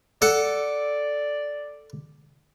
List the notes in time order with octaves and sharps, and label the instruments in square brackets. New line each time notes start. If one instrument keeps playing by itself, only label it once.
[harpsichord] A4 F#5 [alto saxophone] D5